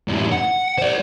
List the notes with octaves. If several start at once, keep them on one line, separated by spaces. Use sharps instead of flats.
F#2 A2
F#5
C5 D5